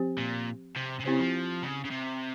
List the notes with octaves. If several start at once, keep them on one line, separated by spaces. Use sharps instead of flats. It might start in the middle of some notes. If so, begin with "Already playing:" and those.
Already playing: F3 C4 G4 C5
A#2
C3
C3
C#3 C4 E4 G4 C5
F3
C#3
C#3
C3